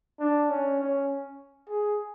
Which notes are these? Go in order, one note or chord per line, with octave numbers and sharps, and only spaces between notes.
D4
C#4
C#4
G#4